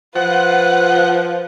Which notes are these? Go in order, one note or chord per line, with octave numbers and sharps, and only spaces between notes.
F3 F4 B4 F#5